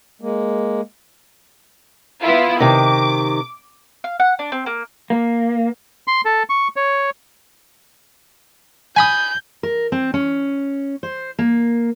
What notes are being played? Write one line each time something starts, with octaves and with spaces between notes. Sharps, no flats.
G#3 A#3
B3 E4 F4
C3 D#3 D6
F5
F#5
D4
C4
A#3
A#3
C6
A4
C#6
C#5
G#5 B5 D#6 G6
A#4
C4
C#4
C5
A#3